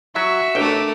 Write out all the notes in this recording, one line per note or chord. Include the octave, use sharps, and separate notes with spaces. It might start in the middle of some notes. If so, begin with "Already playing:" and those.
F#3 F#4 E5 C#6
A1 A3 D4 A#4 G5 D6